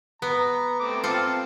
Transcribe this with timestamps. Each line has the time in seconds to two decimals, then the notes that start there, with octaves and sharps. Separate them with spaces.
0.22 B3 A#5
0.80 A3 C4 D6
1.03 C4 F4 A4